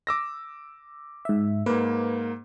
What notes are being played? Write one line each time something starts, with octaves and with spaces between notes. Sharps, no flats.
D6 E6 A#6
G#2 E5
G#2 A#3 B4